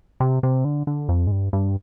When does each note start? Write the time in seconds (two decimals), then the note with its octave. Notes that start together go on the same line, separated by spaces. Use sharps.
0.20 C3
0.43 C3
0.65 D3
0.87 D3
1.09 F2
1.27 G#2
1.31 G2
1.53 G2